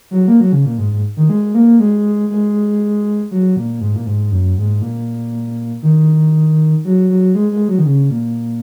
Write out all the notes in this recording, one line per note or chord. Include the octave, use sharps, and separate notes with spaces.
F#3
A#3
F#3
C#3
A#2
G#2
G#2
D#3
G#3
A#3
G#3
G#3
F#3
A#2
G#2
A#2
G#2
F#2
G#2
A#2
D#3
F#3
F#3
G#3
G#3
F#3
D#3
C#3
A#2